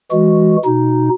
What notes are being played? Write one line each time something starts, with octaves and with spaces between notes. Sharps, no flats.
E3 G#3 F#4
B2 D#4